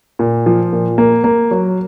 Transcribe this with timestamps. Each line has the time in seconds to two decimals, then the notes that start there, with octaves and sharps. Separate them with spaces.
0.19 A#2
0.46 F3
0.73 A#2
0.98 A#3
1.24 A#3
1.51 F#3